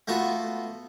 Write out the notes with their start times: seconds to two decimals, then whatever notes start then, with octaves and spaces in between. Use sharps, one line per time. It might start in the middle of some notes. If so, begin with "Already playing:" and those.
0.08 A3 B3 F4 F#4